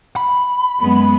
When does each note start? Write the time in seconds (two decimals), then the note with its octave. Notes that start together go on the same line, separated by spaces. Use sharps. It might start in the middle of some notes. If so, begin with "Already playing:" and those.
0.16 B5
0.81 F#2 G#3 B3